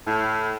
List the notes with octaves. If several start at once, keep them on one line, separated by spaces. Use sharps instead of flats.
A2